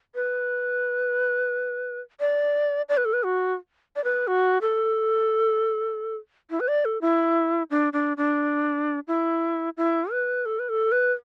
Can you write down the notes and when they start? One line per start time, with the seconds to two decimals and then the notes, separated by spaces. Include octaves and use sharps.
0.15 B4
2.20 D5
2.89 D5
2.97 B4
3.05 A4
3.13 B4
3.23 F#4
3.96 D5
4.04 B4
4.27 F#4
4.61 A4
6.50 E4
6.60 B4
6.68 D5
6.85 A4
7.01 E4
7.70 D4
7.93 D4
8.17 D4
9.08 E4
9.77 E4
10.11 B4
10.46 A4
10.59 B4
10.69 A4
10.92 B4